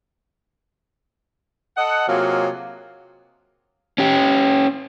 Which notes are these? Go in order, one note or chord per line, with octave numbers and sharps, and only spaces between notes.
A4 D#5 F#5
C3 F#3 A#3 F4 G#4
C#4 G4